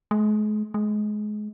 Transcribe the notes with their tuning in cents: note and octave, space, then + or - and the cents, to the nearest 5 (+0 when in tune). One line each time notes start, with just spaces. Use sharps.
G#3 +40
G#3 +25